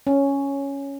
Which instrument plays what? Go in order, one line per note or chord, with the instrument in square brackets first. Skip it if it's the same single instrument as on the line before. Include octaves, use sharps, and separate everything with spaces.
[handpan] C#4